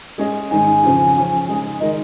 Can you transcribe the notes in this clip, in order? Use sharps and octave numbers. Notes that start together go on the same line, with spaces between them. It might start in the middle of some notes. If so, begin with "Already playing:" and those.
G#3 C#4 G#4 D#5
G#2 D#3 G#3 D#4 G#5
F2 C#3 F3 C#4 F4
F3 C#4 F4
C#3 G#3 D#4 G#4
D#3 G#3 D#4 A#4 D#5